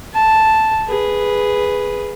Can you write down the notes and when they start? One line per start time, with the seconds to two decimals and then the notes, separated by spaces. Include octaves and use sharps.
0.13 A5
0.88 G#4 B4